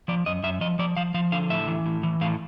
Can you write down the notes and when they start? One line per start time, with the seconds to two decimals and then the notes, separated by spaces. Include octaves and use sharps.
0.08 F3 D5
0.26 F#2 D#5
0.43 F#2 E5
0.61 F3 D#5
0.79 F3 D5
0.97 F3 F5
1.14 F3 F5
1.32 D3 F5
1.50 A2 E5
1.67 E3
1.86 A2
2.03 E3
2.21 A2 F5